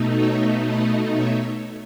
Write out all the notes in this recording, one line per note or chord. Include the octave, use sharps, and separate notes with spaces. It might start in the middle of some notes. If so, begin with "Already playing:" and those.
Already playing: B2 A3 D#4
C#5 E5
B4 D#5
C#5 E5